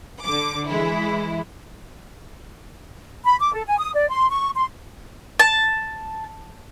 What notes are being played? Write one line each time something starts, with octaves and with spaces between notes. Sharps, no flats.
D3 D6
E3 G#3 E4
B5
D6
A4
G#5
D#6
D5
C6
C#6
C6
A5